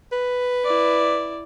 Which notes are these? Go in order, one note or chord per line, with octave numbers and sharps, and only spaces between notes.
B4
E4 D5